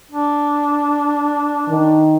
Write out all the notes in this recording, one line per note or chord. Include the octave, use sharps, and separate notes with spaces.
D4
D#3